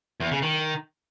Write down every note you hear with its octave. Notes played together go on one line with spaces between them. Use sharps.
E2
C#3
D#3